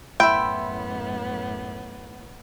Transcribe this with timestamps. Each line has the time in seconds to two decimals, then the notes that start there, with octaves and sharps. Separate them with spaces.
0.20 F#2 A2 B3 E4 E5 G5 C6